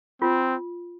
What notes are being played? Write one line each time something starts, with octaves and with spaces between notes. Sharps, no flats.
C4 F4